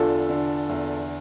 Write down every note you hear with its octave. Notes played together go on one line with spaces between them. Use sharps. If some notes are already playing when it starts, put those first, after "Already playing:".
Already playing: E2 D3 F4 A4
D3
E2